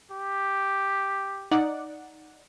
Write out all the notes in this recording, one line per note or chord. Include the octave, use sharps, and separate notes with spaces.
G4
D#4 D5 F#5